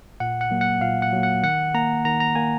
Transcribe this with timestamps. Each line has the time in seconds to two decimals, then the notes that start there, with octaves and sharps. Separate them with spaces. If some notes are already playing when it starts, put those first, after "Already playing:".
0.20 A#2 F#5
0.41 F#5
0.51 F#3 A#3
0.61 F#5
0.81 A#2 F5
1.02 F#5
1.13 F#3 A#3
1.23 F#5
1.43 D#3 F#5
1.74 A#3 A#5
2.05 D#3 A#5
2.20 A#5
2.35 A#3 G#5